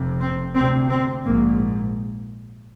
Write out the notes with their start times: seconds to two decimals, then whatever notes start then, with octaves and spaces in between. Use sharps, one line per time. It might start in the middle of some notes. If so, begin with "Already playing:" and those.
Already playing: F1 F2 C3
0.21 C4
0.55 D2 C3 C4
0.89 C4
1.24 A#1 G#2 A#3